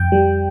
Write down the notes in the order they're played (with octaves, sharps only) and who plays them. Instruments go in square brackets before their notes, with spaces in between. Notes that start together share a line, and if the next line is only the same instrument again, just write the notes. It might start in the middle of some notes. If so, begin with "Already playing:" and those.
Already playing: [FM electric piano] F2 G5
G3